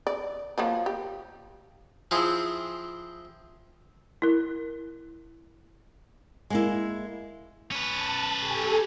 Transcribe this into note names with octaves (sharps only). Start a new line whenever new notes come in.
D5
F3 F#3 A#3
G4
F3 C4 E4 G#4
E4 A#4
G#3 A#3 E4
C#4 B4 A5
G4 A4 G#5